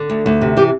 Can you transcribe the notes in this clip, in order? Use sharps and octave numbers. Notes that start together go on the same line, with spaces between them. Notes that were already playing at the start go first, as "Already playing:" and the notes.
Already playing: D3
D2
D2
C3
E3 G4